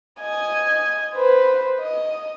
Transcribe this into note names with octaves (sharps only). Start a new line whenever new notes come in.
D#5 G#5
B4 C5
D#5